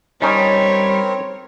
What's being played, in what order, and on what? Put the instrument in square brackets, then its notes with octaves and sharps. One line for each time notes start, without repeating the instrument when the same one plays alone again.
[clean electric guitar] G3 [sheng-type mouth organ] C4 A#4 [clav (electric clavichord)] C#4 D#4 [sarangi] C#5